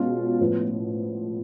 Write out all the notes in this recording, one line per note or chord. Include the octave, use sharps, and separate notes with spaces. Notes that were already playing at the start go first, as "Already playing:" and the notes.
Already playing: B2 G#3 C#4 F4
A2 F3 B3